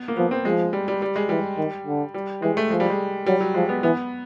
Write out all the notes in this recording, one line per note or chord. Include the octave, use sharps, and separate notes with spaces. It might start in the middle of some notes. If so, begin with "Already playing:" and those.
Already playing: B3
A#3
F3 B3
C4
F3 G#3
G3
G3
G3
G#3
E3 G3
D#3
D3
G3
E3 G#3
A3
F3 G#3
G3
G#3
F#3 G3
F#3
F3 G#3
B3
E3 B3